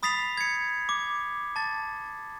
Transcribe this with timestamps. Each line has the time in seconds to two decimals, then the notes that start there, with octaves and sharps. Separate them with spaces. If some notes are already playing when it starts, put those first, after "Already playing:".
0.03 B5 D#6 A6 B6 C7 F7
0.37 G#6 C#7
0.89 D6
1.56 A5 A6